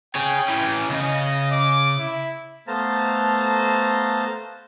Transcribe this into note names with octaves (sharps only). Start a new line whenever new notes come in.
G#4 C#5 G5
E3 C#4
C#3 D#5
D6
E4
A3 B3 C5 F5 A5 A#5